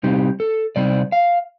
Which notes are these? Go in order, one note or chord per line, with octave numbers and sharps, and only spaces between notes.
C3 G3 C4 D#4 G4
A4
C3 G3 C4 D#4 D5
F5